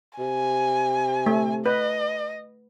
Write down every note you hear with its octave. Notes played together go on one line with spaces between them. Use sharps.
C3 G#5
A3
B4 D#5